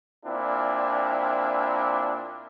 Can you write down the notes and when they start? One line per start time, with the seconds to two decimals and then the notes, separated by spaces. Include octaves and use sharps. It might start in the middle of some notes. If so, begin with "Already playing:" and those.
0.24 A#2 C4 D4 E4